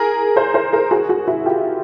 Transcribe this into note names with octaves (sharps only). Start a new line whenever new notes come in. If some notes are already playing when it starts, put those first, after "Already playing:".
Already playing: G#4 A#4
A#4 C5
A#4 C5
G#4 A#4
F#4 G#4
F#4 G#4
E4 F#4
F4 G4